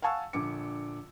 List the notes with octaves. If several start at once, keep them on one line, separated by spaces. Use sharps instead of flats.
F5 F#5 G#5 A5 C#6 E6
A#1 D3 D6 C#7